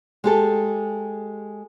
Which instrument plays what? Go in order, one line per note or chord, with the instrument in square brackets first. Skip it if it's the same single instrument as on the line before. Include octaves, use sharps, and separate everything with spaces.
[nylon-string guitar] G#3 G4 A4